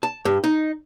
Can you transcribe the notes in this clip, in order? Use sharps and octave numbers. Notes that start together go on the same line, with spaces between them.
A5
G2
D#4